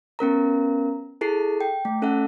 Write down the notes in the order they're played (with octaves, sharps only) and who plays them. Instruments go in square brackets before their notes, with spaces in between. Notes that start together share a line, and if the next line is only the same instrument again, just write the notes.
[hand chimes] B3 C#4 A#4 A#5
E4 G#4 A4 C7
G5
A3
C#4 A4 E5 F#5